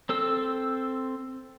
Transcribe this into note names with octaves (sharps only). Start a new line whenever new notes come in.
C4 A4 E6